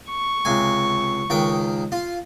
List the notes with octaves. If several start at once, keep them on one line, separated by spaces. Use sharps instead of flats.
C#6
C#2 C3 G#5
C#2 D#3 G5
F4